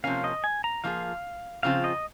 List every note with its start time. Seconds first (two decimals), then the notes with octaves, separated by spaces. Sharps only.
0.04 C3 F3 A#3 C#4 F5
0.24 D#5
0.44 G#5
0.64 A#5
0.84 F3 A#3 F4 G#4 F5
1.63 C#3 F3 C4 F4 F5
1.84 D#5